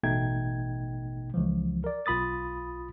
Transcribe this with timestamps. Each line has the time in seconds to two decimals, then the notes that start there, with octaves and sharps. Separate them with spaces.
0.03 A1 B2 A3 D#4 G5 G#6
1.34 C#2 E3 F3
1.84 A#4 D5
2.06 B1 F4 B5 D#6 A6